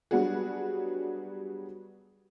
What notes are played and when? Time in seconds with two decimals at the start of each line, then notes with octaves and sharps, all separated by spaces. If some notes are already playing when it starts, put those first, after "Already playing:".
0.11 F#3 G3 B3 D4 F#4 G#4